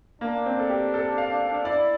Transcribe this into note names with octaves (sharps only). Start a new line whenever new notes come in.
A#3 D4
C4
A4
G4
A4
F5
E4 D5